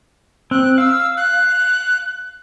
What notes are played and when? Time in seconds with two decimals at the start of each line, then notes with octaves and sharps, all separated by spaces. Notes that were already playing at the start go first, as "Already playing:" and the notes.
0.51 C4 F#6
0.78 F5 E6
1.17 F#6